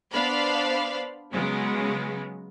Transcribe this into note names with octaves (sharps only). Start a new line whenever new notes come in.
B3 D4 C5 F5 B5
C#3 F#3 G#3 B3